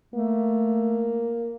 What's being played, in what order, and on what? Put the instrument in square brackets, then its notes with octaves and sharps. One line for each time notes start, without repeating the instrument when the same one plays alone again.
[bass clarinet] A3 [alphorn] A#3